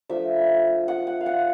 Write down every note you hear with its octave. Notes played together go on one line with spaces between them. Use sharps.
F3 A3 D4 F4 E5
F#5
F#5
F5
F#5